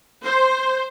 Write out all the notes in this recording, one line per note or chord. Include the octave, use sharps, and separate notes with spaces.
C5